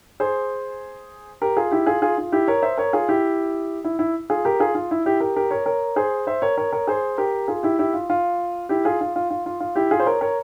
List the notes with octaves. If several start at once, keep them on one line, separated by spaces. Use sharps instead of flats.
G#4 C5
G4 A#4
F4 G#4
E4 G4
F4 G#4
F4 G#4
F4
E4 G4
A#4 C#5
C5 E5
A#4 C#5
F4 G#4
E4 G4
E4
E4
F4 G#4
G4 A#4
F4 G#4
F4
E4
E4 G4
G4 A#4
G4 A#4
A#4 C#5
A#4 C#5
G#4 C5
C5 E5
A#4 C#5
A#4 C#5
A#4 C#5
G#4 C5
G4 A#4
F4 G#4
E4 G4
E4 G4
F4
F4
E4 G4
F4 G#4
F4
F4
F4
F4
F4
E4 G4
F4 G#4
C5
A#4 C#5
A#4 C#5